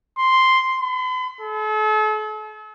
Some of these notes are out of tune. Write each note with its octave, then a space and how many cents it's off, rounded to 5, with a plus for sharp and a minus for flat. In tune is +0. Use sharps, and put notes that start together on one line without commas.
C6 +0
B5 +45
A4 -40